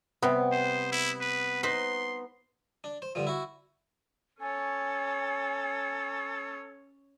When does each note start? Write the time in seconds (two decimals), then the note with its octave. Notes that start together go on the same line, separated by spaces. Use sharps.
0.22 C3 G3 B3
0.52 C5
0.92 E4
1.21 B4
1.63 D#4 B4 C5 C6
2.84 D4
3.02 C5
3.15 G2 D3 F3
3.27 E4 F#4
4.41 C#4 A4 C#5 G#5